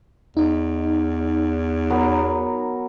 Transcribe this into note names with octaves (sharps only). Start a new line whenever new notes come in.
E2 D#4
F#3 B3 A#4